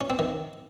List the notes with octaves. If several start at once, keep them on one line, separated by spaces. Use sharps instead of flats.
C#4
C4
D#3